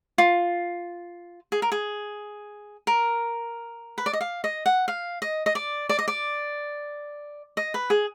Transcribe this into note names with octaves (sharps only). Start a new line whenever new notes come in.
F4
G#4
A#4
G#4
A#4
B4
D5
D#5
F5
D#5
F#5
F5
D#5
D#5
D5
D5
D#5
D5
D#5
B4
G#4